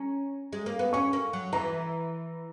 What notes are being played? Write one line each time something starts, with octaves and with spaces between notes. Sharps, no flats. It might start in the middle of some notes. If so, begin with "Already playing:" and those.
Already playing: C#4 A#5
G#3
A#3
B3
C#4 C#6
A#3
F#3
E3 A#5